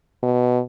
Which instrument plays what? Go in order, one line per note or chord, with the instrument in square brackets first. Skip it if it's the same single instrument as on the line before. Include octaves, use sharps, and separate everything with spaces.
[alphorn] B2